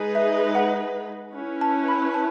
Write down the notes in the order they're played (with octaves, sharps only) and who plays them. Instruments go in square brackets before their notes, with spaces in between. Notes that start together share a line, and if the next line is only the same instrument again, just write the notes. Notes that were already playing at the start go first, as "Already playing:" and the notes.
Already playing: [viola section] G#3 D#4 G#4 B4
[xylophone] E5
F#5
[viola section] C#4 E4 B4
[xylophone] A5
B5
A5